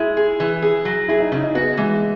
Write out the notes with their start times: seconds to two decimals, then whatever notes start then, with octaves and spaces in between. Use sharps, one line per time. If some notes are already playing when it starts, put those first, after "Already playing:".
Already playing: G#3 E4 E5
0.17 G#4
0.40 E3
0.62 G#4
0.85 F#3
1.08 E4 G#4 E5
1.20 D#4 D#5
1.32 C#3 D#4 D#5
1.43 D#4 D#5
1.55 B3 F#4 B4
1.77 E3 G#3 G#4